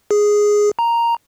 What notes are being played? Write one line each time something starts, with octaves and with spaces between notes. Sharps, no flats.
G#4
A#5